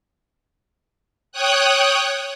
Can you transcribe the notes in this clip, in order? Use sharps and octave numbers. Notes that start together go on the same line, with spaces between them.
C#5 G5 D#6 F#6